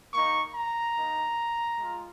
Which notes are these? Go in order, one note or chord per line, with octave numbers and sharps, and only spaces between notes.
A#3 D#4 C#6
A#5
A#3 D#4
G#3 F4